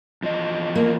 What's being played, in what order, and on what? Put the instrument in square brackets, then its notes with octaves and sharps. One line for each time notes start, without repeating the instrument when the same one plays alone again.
[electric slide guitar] E2 F3 D#5
[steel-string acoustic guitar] A#3